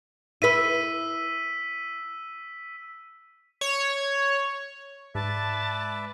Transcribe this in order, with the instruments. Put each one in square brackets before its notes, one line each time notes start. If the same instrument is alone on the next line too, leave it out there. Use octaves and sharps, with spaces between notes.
[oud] E4 B4 [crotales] E6 B6 D#7
[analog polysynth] C#5
[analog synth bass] G#2 [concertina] B4 D5 E5 [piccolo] A5